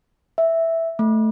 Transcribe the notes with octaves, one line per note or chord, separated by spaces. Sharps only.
E5
A3